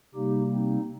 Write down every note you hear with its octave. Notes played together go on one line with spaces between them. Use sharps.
C3 G3 A#3 D#4 G4
C4 D#4